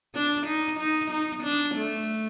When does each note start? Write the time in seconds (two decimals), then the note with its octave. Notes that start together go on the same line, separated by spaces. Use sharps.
0.15 D4
0.46 D#4
0.79 D#4
1.11 D#4
1.43 D4
1.75 A3